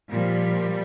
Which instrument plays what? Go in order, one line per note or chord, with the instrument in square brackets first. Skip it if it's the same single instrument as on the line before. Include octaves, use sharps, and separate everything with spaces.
[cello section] A#2 F3 G3